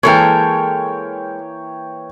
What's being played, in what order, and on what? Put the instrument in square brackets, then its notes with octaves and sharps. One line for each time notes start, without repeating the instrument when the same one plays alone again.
[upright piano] E3 A#3 [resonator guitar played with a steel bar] G#3 A4 A#4 [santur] C#5 G5